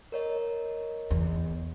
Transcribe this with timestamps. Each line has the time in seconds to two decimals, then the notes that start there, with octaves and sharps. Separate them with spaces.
0.12 A#4 C#5 D#5
1.11 E2